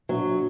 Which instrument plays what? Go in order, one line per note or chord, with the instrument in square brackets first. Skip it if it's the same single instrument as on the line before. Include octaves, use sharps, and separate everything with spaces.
[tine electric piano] A#2 A#3 D4 [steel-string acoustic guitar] F#3